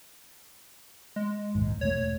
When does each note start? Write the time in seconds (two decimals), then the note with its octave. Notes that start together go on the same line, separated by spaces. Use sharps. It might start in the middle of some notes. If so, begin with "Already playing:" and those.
1.16 G#3
1.55 A#1 D#2 G#2
1.81 E1 A3 C#5